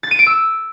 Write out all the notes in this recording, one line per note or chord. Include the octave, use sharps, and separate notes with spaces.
A6
D#7
D7
E6